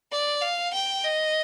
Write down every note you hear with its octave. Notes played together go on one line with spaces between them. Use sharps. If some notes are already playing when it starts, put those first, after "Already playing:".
D5
F5
G5
D#5